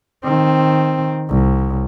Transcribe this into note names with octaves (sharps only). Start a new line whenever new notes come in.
D#3 C4
C2